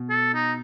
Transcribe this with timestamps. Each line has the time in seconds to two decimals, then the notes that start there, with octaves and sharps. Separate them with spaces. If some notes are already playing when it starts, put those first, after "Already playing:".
Already playing: B2
0.10 A4
0.34 D#4